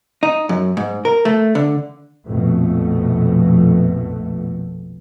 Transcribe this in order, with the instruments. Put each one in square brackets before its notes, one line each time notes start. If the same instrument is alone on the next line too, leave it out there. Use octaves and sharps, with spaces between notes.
[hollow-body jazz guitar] D#4
F#2
G#2
A#4
A3
D3
[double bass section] A#1 F2 B2 A3